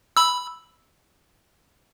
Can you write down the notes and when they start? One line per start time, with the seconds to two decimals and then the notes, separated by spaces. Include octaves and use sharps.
0.17 B5 E6